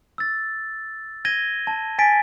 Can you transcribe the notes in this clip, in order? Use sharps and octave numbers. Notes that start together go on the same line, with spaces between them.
E6 A6
G#6 A#6 D#7 G7
A5
G#5 A6 B6 D7